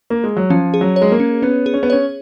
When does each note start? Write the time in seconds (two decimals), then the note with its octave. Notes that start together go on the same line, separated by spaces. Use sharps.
0.10 A#3
0.24 G#3
0.37 F#3
0.50 F3 C#4
0.74 G#4
0.81 F#3
0.96 C#5
1.02 G#3
1.12 A#3
1.20 C#4
1.42 B3 C#4
1.66 G#4
1.74 C#4
1.83 B3
1.90 C#4 C#5